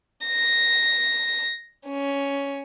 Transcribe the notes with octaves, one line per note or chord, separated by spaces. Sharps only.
A#6
C#4